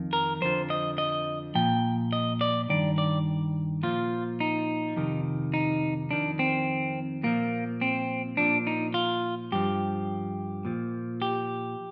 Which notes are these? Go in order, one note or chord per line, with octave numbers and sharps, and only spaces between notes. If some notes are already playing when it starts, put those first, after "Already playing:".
Already playing: F2 D#3
A#4
F2 D3 F3 C5
D#5
D#5
A#2 F3 G5
D#5
D5
G2 D#3 D5
D5
A#2 F3 F4
D#4
F2 C3 D#3
D#4
F2 D#3 D4
C4
A#2 F3 A#3
C4
A#2 F3 D4
D#4
F4
G2 F3 G4
A#2 F3
G4